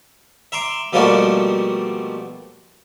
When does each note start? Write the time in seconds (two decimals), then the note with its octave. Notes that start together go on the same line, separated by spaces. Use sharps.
0.52 E5 A#5 C6 D6
0.93 B2 F3 G3 A3 A#3 F#4